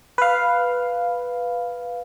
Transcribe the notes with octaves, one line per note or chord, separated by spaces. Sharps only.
B4 F5